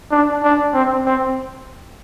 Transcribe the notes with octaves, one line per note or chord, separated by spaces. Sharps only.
D4
D4
C4
C4